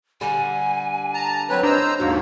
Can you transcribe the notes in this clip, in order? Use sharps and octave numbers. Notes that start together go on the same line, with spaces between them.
D3 G3 G#5
A5 A#5
F#3 C4 B4 C#5
D4 C5 D#5 A#5 E6
D#2 G#2 F3 A#3 F#4